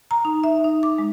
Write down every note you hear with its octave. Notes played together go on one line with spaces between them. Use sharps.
A#5
D#4
E5
D#4
D6
G#3